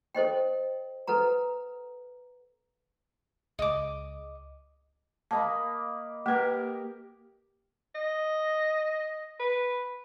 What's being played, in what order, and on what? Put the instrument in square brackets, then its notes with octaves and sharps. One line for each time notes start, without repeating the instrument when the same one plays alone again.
[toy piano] A4 C5 D#5 G5
A4 B4 F#5 A#5
[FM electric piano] C#2 [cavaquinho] D#5 D6
[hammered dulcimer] A#3 D#5 B5 [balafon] A5
[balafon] A#3 B4 [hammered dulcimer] G4 A#4
[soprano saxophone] D#5
B4